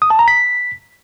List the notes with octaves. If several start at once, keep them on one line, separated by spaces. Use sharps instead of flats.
D#6
A5
A#5
B6